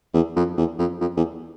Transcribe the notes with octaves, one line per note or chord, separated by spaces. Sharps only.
E2
F2
E2
F2
F2
E2